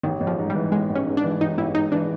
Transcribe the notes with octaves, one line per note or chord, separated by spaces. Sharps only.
A1 D#3
A1
F3
G#2
E3 G3
A1 G#3
A1
C#4
G#2
D4
E3
A1 D#4
A1 E4
G#2 D#4
E3 D4